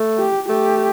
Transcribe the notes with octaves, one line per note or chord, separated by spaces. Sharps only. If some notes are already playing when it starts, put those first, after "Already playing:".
Already playing: A3
G4
A3 G4